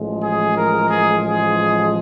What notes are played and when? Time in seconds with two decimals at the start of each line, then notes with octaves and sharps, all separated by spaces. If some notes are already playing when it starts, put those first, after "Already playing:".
Already playing: A1 A2 F3 G#3
0.23 G#4
0.56 A#4
0.90 G#4
1.23 G#4